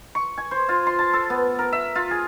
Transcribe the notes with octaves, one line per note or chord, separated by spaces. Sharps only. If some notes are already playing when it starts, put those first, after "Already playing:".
C#6
G#5
C5
F4
C6
A5
A4
B3
A#4
E5
F4
G#4